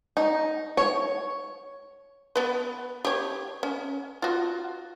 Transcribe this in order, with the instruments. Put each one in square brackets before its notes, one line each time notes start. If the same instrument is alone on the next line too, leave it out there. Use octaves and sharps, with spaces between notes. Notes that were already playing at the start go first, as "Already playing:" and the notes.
[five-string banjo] D#4
C#5
[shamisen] B3 B4
G4 C#5
C#4
F4 F#4